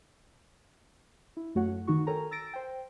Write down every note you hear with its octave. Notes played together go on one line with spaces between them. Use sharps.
E4
F#2 A3 F#4 C#5 F#5
D#3 D#4 F#4 C#6
A4 A#4 C#5 G5 G#5 A#5
E6 A6 A#6 D7
C5 G5